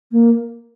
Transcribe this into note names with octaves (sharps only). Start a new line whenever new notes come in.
A#3